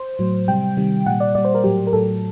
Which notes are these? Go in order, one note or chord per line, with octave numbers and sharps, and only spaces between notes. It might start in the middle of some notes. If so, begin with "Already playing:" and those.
Already playing: C5
A2 F#3
C3 G3 G5
C3 D#3 G3
A#2 G3 F#5
D5
A#2 G3 D5
C5
A#4
A2 F#3 G4
A#4
A2 F#3 A4